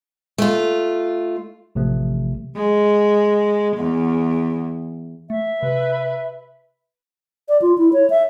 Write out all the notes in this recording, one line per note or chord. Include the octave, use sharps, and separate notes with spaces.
A3 F4
A1 C3 F3 A3
G#3
E2
A3 E5
C3 B4
D5
F4
E4
C#5
E5